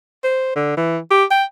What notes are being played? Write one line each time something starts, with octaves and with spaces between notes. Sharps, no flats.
C5
D3
E3
G4
G5